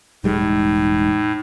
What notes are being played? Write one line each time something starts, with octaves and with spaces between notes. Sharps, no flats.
E1 A2 G3 G#3 D#4